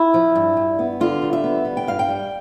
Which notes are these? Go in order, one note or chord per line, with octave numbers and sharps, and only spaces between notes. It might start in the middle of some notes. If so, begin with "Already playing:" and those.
Already playing: E4
F3
G2
G2
B3
D3 F4
G3
E5
B3
G3
G5
G2 F5
G5
G3